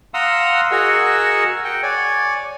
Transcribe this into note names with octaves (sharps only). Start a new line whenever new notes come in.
F5 F#5 A#5 C6 D#6 E6
F#4 G#4 A#4 D#5 F#5 E6
F#5 G5
C#5 D5 G#5